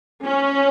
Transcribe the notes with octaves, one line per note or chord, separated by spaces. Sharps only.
C#4